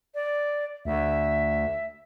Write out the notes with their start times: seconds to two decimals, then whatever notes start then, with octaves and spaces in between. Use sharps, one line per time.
0.15 D5
0.85 D2 E5